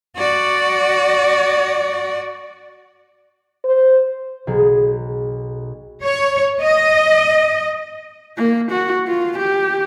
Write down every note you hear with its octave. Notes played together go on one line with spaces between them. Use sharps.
F#4 D5
C5
B1 F#3 G#4
C#5
D#5
A#3
F#4
F4
G4